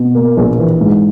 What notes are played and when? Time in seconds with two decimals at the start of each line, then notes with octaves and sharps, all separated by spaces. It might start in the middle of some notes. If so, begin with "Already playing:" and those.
Already playing: B2
0.15 A#3
0.37 A#1
0.59 E3
0.80 G#2